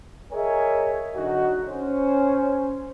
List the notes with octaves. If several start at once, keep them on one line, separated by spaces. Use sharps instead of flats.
G#4 A#4 C#5 D#5 E5 G#5
D3 F#3 D#4 F#4
C#4 C5